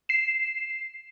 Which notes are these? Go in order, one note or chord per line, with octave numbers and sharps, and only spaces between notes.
C7 E7